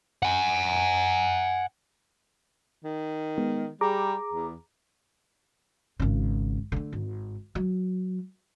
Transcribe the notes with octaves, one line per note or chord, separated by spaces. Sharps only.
F#5 G#5
D#3
G#3 B3
G3 G#4 A#5 D6
E2
G#1 C#3
D3 A3
G#1
F#3